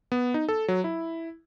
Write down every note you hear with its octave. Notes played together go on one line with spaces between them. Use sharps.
B3
D#4
A4
F#3
E4